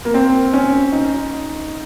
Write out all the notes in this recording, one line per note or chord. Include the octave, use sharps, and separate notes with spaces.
A#3
C4
C#4
D#4